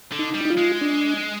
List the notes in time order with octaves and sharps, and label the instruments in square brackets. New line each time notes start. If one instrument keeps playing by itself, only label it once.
[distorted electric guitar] D3
[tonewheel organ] D#4
[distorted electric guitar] G3
[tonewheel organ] D#4
F4
[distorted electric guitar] G#3
[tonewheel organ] D4